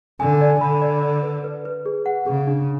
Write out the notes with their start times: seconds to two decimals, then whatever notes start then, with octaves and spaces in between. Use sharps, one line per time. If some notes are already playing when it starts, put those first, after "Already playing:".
0.20 D3 G#5
0.41 D5
0.61 D3 B5
0.82 D5
1.03 D5
1.23 B4
1.44 B4
1.65 B4
1.86 G#4
2.06 F#5
2.26 C#3 G#4
2.47 D4